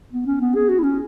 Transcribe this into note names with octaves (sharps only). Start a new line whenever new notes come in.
B3
C#4
B3
G#4
F#4
E4
C#4